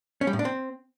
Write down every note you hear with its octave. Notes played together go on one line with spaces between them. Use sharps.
C#4
G3
A2
D4
C4